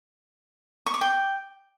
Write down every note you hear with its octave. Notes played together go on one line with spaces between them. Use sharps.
C#6
D6
G5